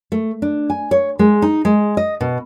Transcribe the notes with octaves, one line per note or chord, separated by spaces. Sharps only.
A3
D4
G#5
C#5
G#3
D#4
G#3
D#5
B2